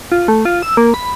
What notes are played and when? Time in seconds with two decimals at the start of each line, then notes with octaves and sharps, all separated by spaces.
0.12 F4
0.28 A3
0.45 F4
0.62 E6
0.77 A#3
0.94 B5